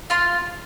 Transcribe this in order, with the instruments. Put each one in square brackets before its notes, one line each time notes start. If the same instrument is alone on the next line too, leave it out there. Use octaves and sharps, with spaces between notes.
[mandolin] F4 C6